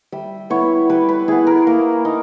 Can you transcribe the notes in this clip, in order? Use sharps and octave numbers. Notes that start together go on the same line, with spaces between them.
G3 E5
B3 E4 C#5
G3 B4
B4
B3 E4 G#4
A#4
A#3
D#4